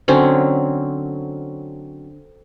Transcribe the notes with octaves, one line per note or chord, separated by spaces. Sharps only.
D3 F#3 C4 C#4